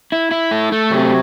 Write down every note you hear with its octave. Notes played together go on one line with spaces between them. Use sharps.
E4
E4
A3
A3
C3 F#3